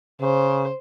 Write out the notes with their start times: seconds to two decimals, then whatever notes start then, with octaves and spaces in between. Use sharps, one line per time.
0.21 C#3 C5